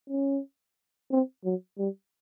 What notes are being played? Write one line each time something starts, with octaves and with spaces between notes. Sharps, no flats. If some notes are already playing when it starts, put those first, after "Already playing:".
C#4
C4
F#3
G3